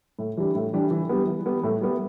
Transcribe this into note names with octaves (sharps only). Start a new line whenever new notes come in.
A2
E3 G3 D4 G4
A2
E3 G3 D4 G4
E3
G3 B3
E3
G3 B3
A2
G3 B3